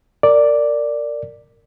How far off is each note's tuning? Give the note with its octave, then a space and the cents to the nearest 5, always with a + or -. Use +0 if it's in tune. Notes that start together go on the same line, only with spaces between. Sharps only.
A#4 -20 D5 +0